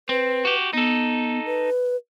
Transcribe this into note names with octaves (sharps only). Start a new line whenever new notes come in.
C4 B4
F#4 G4
B3 D#4 A4
B4